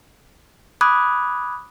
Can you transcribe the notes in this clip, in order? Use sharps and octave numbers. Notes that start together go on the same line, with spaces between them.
B5 D6 D#6 F#6 G#6